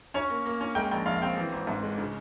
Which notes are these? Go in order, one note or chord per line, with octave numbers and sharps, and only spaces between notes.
C#4 C#5
A#3
A#3
C#4
G#3 G5
A#1 G5
A#1 F5
F5
C4 G5
E3
G#1
G#2
G#3
C#3